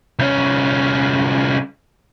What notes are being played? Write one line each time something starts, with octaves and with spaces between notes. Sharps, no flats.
C2 C#4